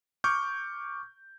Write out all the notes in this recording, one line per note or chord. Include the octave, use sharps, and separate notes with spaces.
C#6 D6 F6 G6